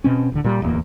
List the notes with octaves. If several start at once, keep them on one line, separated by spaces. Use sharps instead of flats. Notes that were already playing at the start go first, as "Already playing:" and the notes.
B2 C4 C#4
D1 D3
A#2 G3
D1 E2 A#3